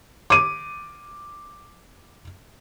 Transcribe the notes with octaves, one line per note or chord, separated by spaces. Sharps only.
D6 D#7